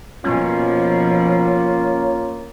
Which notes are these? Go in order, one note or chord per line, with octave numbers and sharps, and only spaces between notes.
B2 F3 A#3 C#4 F4